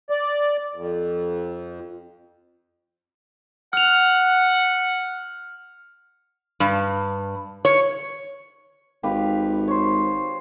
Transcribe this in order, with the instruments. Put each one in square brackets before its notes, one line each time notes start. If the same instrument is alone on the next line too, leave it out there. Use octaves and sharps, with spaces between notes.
[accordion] D5
F2
[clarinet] F#5 [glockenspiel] F6 F7
[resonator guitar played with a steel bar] G2
C#5
[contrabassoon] G#1 [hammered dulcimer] G4 B4 F5
[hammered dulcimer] C5 C#5